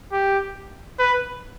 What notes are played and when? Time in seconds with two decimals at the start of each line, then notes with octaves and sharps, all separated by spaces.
0.12 G4
0.99 B4